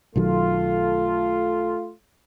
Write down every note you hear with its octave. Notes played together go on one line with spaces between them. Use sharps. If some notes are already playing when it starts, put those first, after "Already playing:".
B1 D#3 F#3 A3 F4